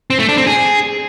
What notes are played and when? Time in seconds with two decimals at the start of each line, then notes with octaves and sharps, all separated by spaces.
0.10 C4
0.19 A3
0.28 D4
0.38 C4
0.47 G#4